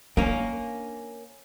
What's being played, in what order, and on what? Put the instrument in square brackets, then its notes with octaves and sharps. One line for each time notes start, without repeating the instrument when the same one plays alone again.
[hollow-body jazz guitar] A#3 C#4 [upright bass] D4